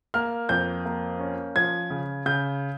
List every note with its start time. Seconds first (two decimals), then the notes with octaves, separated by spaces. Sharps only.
0.14 A#3 F6
0.49 F2 G6
0.85 A#3
1.19 C#4
1.56 F3 G#6
1.90 C#3
2.26 C#3 G6